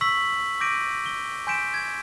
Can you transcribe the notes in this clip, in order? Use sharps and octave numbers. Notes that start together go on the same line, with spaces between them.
C#6 E6 B6 F#7
D6 G6 A#6 D7 D#7
G7
G#5 C6 G6 B6 D7 E7
G#6